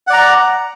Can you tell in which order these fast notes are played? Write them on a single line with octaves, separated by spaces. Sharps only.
F#5 D5 A#5